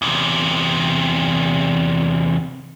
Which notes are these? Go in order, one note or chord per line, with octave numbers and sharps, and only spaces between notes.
E2 C3